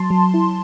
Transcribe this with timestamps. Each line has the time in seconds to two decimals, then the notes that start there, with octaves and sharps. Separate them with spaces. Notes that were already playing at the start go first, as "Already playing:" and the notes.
Already playing: F#3 A5 C6
0.10 F#3
0.34 E4